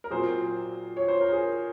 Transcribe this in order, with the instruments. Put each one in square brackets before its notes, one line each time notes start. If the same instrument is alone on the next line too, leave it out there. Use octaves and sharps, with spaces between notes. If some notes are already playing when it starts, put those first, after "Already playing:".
[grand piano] A#4
[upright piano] A#2 F#3 C4 [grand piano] G#4 C5
[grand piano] C#5
C5
A#4
G#4 C5